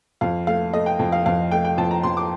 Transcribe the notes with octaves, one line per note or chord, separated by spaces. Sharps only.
F2 F5
A3 F5
A3 D#5
G5
F2
F5
F2 F5
A3 G5
G5
F2 A5
A#5
F2 C6
D6